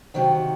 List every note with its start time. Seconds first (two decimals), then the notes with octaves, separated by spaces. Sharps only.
0.14 C3 D#3 F#3